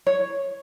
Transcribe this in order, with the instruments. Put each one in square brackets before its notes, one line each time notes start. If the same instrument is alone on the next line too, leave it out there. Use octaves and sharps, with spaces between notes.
[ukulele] C#5